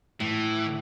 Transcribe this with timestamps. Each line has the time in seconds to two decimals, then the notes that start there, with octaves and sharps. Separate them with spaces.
0.20 A2 E3